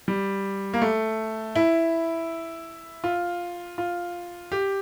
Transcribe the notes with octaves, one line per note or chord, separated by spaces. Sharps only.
G3
A#3
A3
E4
F4
F4
G4